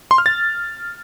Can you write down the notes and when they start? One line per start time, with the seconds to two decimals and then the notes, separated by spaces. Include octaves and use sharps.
0.11 C6
0.18 F6
0.26 A6